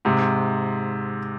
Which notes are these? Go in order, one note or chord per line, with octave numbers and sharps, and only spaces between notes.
G#2 C3